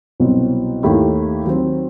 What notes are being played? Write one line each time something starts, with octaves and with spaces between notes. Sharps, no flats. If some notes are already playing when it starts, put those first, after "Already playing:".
C2 B2 F#3 C4
D#2 D#3 A3 E4 G4
D#3 F#3 C4